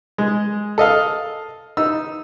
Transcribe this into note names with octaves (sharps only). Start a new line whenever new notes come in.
G#3
A4 D#5 F5
D#4 E6